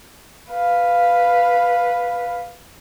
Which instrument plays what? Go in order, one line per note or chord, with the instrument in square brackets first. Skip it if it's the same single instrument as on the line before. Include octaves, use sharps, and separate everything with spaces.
[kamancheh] B4 F5